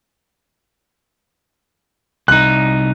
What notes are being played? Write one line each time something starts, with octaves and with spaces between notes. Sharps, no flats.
C2 D#4 F#6